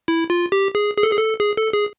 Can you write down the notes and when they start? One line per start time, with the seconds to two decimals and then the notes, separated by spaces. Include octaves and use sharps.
0.08 E4
0.30 F4
0.52 G4
0.75 G#4
0.97 G#4
1.03 A4
1.11 G#4
1.18 A4
1.40 G#4
1.57 A4
1.73 G#4